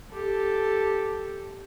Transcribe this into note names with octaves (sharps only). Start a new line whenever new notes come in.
G4 A4